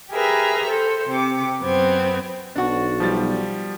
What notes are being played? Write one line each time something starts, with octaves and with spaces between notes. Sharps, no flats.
G4 G#4 A#4 B4 E5 A#5
A4 C5
C3 D6
F#2 B3 C4 G#6
B1 D4 F#4
F3 G3 A6